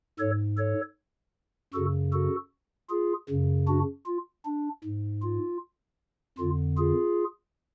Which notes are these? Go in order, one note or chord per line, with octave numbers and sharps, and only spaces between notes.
G#2 A4 C#5
A4 C#5
F#2 C#3 F#4 A4
F#4 A4
F4 G#4
F#2 C#3
D4 F#4
F4
D4
G#2
F4
F2 D3 F4
F4 G#4